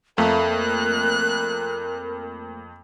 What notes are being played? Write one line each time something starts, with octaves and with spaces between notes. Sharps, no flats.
F2 A3 A#3 A#4 B5 F#6